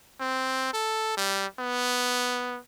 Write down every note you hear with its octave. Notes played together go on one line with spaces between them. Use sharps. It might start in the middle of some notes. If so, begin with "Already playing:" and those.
C4
A4
G3
B3